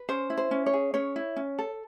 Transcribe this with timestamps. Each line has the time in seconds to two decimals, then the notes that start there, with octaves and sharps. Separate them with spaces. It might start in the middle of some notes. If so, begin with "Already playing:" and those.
Already playing: B4
0.09 C#4 C5
0.30 E4
0.37 C5
0.51 C#4
0.66 C#5
0.73 G#4
0.94 C#4 C#5
1.16 E4
1.36 C#4
1.59 A4